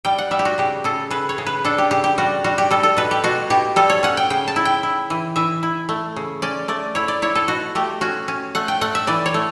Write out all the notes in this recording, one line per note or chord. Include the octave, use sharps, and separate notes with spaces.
G3 G5
F#5
G3 E5
G4
F#4
C#3 G4
C#3 A4
C#3 B4
C#5
C#3
B4
D4 A4
G4
C#3 G4
G4
G3 F#4
G3 F#4
G4
G3 A4
A4
B2 B4
G4
B2 F#4
B2 G4
G3 A4
C#5
C#4 F#5
G5
C#3 G5
A5
E4
G5
E4
E3
E3 E5
E4
A3
C#3
C#4 D5
A3 D5
E4 C#5
D5
E4 C#5
A4
B2 F#4
A3 G4
C#4 F#4
C#4
A3 F#5
G5
A3 F#5
E5
E3 D5
C#5
A3